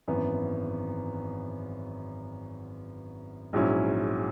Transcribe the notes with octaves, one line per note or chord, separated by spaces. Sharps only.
G#1 F#2 E3 B3
A#1 G#2 F#3 C#4 E4